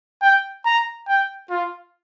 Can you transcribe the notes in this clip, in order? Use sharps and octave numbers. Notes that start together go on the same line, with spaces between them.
G5
A#5
G5
F4